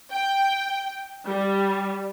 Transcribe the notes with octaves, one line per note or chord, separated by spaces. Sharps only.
G5
G3